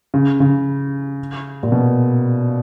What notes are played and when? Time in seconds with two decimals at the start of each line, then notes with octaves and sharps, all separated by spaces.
0.14 C#3
0.40 C#3
1.63 A#2
1.72 B2